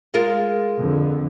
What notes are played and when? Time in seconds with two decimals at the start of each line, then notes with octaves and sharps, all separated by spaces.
0.14 G#3 F4 A#4
0.77 F2 D3